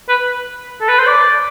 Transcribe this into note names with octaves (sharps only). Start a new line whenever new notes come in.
B4
A4
B4
C5
D5